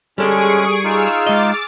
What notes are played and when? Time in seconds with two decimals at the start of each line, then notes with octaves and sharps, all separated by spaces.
0.18 G3 G#3 C#4 G#4 A4 D5 C#6 D7
0.84 D#4 F4 F5 E6 F6
1.26 G#3 D#5 D6 A6